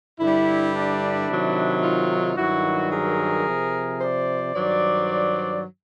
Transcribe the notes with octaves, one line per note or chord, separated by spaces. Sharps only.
G2 D3 G3 D4 E4
D4 E4
C3 D#3 F#3
D#4 F4
G2 D#3 F#3 E4 F#4
G#4 A#4
C3 F3
C5 D5
G2 D#3 F#3 C5 D5